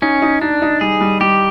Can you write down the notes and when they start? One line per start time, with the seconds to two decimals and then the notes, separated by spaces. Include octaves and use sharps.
0.02 C#4 D#4
0.22 D#4
0.41 D4 D#4
0.62 D#4
0.81 G3 G#4
1.01 G3
1.21 G3 G4